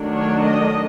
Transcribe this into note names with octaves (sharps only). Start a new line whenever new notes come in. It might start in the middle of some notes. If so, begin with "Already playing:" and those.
Already playing: D#3 F#3 A3 D4
C#5
D#5